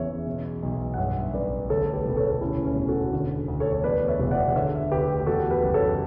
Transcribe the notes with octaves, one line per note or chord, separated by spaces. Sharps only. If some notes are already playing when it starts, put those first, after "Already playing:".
Already playing: G1 E2 C#3 C#5 E5
B2
B1
F#5
G2 C#5 E5
A1 B4 D5
D2 A4 C#5
C#5
G4 B4
E1 B4
A4 C#5
D2 C#4 E4
C#4
E1
F#4 A4
D3
D2
A4 C#5
C#5
E2 B4 D5
C#5 E5
E1
D5 F#5
D3 C#5 E5
D2 G4 B4
G4
E2 F#4 A4
G4 B4
F#1
A4 C#5